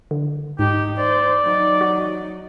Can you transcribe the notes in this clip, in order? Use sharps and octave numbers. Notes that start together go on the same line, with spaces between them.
D3
G#2 D#4 G4
C5 D5
F#3 D#4
F#4